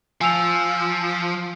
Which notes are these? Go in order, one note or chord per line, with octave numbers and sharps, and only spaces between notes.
F3 G#5 E6 F7